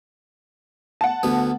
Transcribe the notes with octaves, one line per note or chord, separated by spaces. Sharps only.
F#5 A5
D2 B3